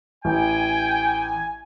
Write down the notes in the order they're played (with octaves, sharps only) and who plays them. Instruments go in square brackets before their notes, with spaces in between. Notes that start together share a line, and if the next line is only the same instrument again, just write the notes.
[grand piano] A1 [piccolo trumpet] G5 [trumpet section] G#5